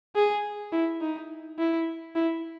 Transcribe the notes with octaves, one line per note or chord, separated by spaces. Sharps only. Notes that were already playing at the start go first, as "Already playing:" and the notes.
G#4
E4
D#4
E4
E4